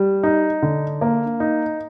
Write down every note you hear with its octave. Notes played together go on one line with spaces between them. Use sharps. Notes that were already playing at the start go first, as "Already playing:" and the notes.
Already playing: G3
D#4
D3
A#3
D#4